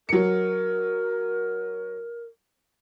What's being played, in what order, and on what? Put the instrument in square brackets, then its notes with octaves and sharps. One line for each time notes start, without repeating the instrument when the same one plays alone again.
[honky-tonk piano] F#3 C#7 [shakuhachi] A#4